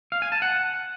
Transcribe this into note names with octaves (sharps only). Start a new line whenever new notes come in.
F5
G#5
A5
F#5